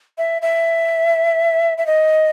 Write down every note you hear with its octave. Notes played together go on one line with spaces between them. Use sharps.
E5
E5
E5
D#5